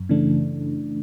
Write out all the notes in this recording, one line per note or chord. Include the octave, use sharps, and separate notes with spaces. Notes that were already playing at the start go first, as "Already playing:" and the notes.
Already playing: F#2
C#3 E3 A3 D4